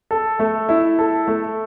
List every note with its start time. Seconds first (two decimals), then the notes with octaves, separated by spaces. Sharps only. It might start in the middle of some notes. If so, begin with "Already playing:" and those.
0.11 A4
0.39 A3
0.69 E4
0.99 A4
1.27 A3